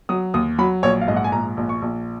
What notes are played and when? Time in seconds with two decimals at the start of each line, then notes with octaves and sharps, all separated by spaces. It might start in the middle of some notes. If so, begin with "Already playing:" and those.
0.09 F#3 D#6
0.34 D#2 D#6
0.58 F#3 B5
0.83 A#1 C#5
1.01 F5
1.08 G#2 D#5
1.16 F#5
1.24 G#5
1.32 A#1 A#5
1.57 A#1
1.69 C#6
1.82 A#1